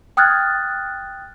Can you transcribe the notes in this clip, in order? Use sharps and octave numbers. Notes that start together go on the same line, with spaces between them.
G5 D#6 F6 F#6 G#6 A6